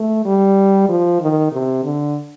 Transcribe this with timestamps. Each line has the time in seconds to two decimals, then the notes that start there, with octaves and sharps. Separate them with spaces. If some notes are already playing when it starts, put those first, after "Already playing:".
Already playing: A3
0.25 G3
0.88 F3
1.21 D#3
1.52 C3
1.84 D3